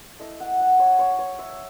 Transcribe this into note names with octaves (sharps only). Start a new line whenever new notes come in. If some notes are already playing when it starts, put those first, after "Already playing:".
A3 E4 D#5
F#5
F#5
C#5
C#5
C#5
E5